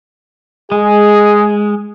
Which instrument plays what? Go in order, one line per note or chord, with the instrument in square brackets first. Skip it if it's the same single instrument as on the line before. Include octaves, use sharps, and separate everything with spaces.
[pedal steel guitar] G#3 [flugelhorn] G#4